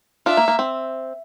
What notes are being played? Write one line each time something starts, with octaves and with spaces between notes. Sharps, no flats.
D4 F4 E5
A#3
A#3
C4